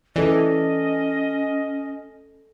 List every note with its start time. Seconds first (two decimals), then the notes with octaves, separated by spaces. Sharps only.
0.16 E3 C#4 A4 D5 D#5